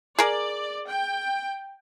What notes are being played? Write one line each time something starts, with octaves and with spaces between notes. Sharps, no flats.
G#4 A#4 D5
G5